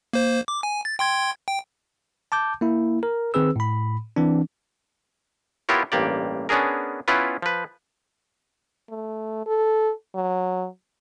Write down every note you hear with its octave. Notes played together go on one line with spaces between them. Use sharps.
A#3 C5
D6
G#5
A6
G5 C6 G#6
G5
A5 D6 G6
A#3 E4
A#4
D#3 C4 G#4 B4 E6
A2 B5
E3 C4 D4
B3 E4 F4 G4 A#4 C#5
A1 G2 A#3 G4 D5
B3 C#4 D4 G#4 A#4
B3 C#4 E4 F4 B4
F3 B4
A3
A4
F#3